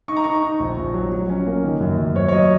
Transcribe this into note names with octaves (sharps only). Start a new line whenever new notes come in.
D#4 C#6
A#5
D#4 C#6
D#4
A#1
A#1
F#3
F#3
C#4
A#3
D#3
F#2
F#2
F#2 C#5
C#5
F#3 D#5